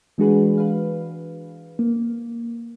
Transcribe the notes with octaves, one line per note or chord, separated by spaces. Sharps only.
E3 G#3 D4 F#4 G#4 B4
B4 F5
A#3